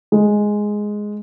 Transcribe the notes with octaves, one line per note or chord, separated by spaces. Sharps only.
G#3